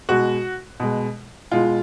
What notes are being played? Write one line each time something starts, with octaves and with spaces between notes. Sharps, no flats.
B2 G#3 F#4
B2 G#3
B2 G#3 F4